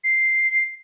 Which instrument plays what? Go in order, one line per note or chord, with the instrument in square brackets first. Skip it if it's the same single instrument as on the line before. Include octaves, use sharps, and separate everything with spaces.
[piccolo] C7